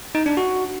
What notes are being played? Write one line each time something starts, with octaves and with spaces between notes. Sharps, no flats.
D#4
D4
F#4